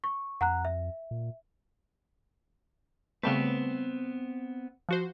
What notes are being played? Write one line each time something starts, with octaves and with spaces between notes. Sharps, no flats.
C#6
F2 F#5 A#5 F#6
E5
A#2
C#3 G3 A3 B3 C4 B4
F3 F#4 C5